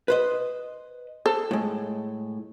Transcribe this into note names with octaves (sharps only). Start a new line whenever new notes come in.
B4 C5 D#5
A4 C5
A2 G#3